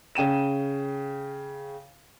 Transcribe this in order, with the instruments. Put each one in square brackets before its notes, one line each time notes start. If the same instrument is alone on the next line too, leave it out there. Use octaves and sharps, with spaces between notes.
[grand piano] C#3 G5 D#7 E7